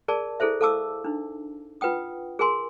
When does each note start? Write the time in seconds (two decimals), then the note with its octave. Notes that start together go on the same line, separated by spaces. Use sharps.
0.08 G#4 A#4 D5 A5
0.40 E4 G#4 A4 C5 E5
0.61 A4 F5 A5 D6 E6
1.04 D4 D#4
1.81 F4 B4 F#5 G5 D#6
2.39 G#4 A#4 G#5 C6